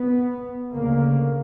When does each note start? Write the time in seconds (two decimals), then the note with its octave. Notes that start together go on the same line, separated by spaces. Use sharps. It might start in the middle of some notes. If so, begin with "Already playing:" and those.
Already playing: B3
0.73 D2 C#3 A#3